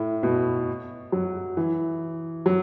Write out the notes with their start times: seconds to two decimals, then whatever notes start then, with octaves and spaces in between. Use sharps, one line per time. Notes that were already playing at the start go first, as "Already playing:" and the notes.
Already playing: A2
0.23 B2
1.12 F#3
1.57 E3
2.46 F#3